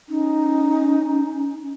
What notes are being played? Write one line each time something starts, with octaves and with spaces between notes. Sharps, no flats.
C#4 D#4